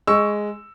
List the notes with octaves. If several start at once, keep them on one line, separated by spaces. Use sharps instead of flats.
G#3 C#6 E6